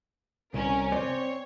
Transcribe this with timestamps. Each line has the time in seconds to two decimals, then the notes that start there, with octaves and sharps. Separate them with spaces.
0.54 C2 C#4 A#4
0.92 C4 C#5 D5